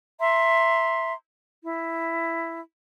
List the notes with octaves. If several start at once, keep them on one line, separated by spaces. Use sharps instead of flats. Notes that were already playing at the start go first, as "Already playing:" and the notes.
E5 A#5 C6
E4